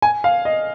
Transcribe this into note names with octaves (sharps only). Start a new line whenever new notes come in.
G#5
F5
D#5